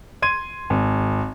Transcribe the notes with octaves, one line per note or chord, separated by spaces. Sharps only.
C6 G#6 D#7
G#1